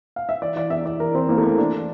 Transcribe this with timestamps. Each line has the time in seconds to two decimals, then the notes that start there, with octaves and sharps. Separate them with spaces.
0.16 F5
0.29 E5
0.42 E3 D5
0.56 E3 D5
0.70 E2 E5
0.85 E2 D5
1.00 E3 A#4
1.14 E3 C4
1.29 E2 A#3
1.38 A3
1.44 E2 A#3
1.58 E3 D4
1.72 E3